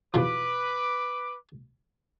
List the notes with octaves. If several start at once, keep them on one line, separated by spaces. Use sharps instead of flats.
E2 B2 F3 B4 D6